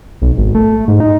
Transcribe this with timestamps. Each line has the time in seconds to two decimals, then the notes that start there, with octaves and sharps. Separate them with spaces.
0.22 B1
0.38 G#1
0.55 A3
0.88 G#2
1.00 D#4